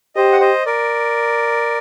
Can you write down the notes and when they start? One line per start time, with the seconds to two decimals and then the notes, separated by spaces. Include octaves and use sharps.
0.16 G4 C5 D#5
0.32 F#5
0.40 C5 D#5
0.66 A#4 D5